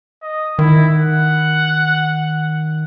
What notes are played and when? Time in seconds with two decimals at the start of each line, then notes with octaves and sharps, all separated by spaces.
0.22 D#5
0.59 D#3 E4
0.94 F#5